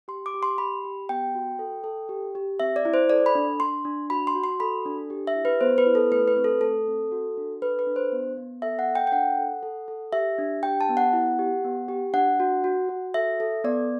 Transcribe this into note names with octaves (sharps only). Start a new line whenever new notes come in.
G4 C6
D6
G4
C6
G4 B5
G4
B3 G5
F#4
A4
A4
G4
G4
C4 E5
D5
E4
C5
A4 D5
B5
D4
D4 C6
D4
F#4 B5
C6
F#4
C6
A4 B5
D4
G4
E5
E4
B4
B3 C5
B4
E4
A4
A3 B4
B4
C4
A4
A3 A4
C4
F#4
D4
A4 B4
B4
D4
C5
B3
B3
A4 E5
F#5
A4
G5
G5
D4 F#5
A4
A4
A4
G4 E5
D4
G4 G5
A5
B3
F#5
E4
G4
B3
G4
D4 F#5
F#4
F#4
F#4
A4 E5
A4
B3 D5